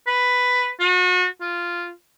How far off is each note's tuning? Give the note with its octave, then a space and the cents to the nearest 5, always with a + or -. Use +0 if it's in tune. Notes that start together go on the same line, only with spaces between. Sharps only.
B4 +5
F#4 -35
F4 -5